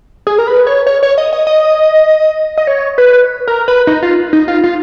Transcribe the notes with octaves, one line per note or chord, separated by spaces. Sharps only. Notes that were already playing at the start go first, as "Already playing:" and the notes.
G#4
A#4
B4
C#5
C#5
C#5
D#5
D#5
D#5
D#5
C#5
B4
A#4
B4
D#4
F4
D#4
F4
F4